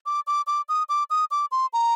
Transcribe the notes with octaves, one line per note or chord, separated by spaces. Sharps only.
D6
D6
D6
D#6
D6
D#6
D6
C6
A#5